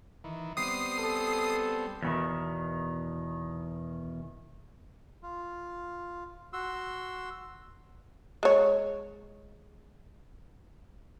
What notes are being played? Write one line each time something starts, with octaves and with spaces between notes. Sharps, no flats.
D#3 E3
G3 B3 C4 D#6 C7
A4
E2 B2 D#3
F4
F#4 C6 E6
G#3 C#5